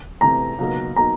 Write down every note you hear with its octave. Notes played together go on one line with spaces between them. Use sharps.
E2 C3 E3 A3 A#5
C#2 B2 F#3 A#3 D#4
B2 F#3 A#3 D#4 A#5